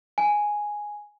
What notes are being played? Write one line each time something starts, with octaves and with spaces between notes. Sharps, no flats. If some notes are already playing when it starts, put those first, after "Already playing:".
G#5